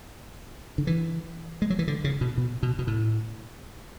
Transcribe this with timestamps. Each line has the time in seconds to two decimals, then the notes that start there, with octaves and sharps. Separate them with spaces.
0.78 D3
0.87 E3
1.62 G#3
1.70 F#3
1.79 E3
1.88 D3
2.04 C#3
2.21 B2
2.38 B2
2.63 B2
2.79 B2
2.87 A2